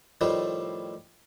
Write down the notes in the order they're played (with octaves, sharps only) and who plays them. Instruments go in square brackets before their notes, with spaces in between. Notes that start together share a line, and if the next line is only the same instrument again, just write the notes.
[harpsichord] A2 D#3 F3 G3 A3